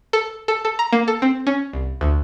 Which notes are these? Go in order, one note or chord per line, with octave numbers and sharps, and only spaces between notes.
A4
A4
A4
A#5
A#3
A4
C4
C#4
C2
D2